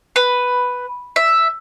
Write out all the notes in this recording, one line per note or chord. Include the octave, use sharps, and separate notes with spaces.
B4
E5